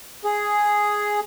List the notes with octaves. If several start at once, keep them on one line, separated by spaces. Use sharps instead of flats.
G#4